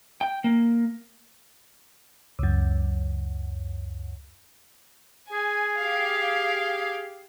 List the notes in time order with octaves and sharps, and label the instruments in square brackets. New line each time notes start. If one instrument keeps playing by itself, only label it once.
[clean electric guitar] G5
A#3
[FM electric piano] C#2 F#2
[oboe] G#4 [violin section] G#5
[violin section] G4 F5